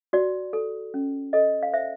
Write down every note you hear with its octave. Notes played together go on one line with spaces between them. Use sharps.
F#4 D5
A4
C#4
A4 D#5
F5
C5 E5